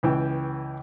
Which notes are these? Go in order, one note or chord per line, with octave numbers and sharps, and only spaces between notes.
C#2 E3 G5